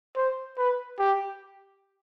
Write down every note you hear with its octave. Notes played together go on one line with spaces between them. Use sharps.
C5
B4
G4